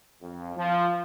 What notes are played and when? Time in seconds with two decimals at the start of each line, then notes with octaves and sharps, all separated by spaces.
0.22 F2
0.57 F3